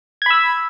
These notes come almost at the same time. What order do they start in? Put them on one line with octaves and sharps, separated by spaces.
G#6 B5 E6